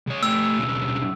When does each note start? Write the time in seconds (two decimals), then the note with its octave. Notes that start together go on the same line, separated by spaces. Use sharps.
0.07 C#2 C#5
0.23 A3 G4 E6
0.58 B1 C#3